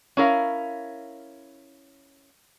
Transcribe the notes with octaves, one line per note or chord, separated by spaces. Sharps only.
C#4 E4 A#4 F5